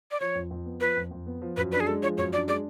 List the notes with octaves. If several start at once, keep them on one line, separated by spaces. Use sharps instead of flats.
D5
F3 C#5
F2
F2
B3
F3 B4
F2
F2
B3
F3
F#2 B4
D4 B4
G#4
G#3 A4
F3 C#5
F#2 C#5
D4 D5
G#3 D5